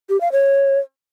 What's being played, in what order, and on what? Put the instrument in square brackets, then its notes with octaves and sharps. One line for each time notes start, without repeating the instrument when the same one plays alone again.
[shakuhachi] G4
F5
C#5